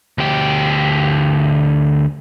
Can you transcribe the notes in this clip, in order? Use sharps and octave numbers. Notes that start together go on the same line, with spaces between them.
D2 G4